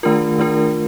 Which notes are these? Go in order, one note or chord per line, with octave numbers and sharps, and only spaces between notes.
D#3 A3 D4 F4 A#4
D#3 A3 D4 F4 A#4